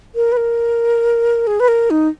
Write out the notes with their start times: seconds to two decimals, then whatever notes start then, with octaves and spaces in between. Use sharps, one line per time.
0.15 A#4
0.32 B4
0.37 A#4
1.47 G#4
1.60 B4
1.68 A#4
1.90 D#4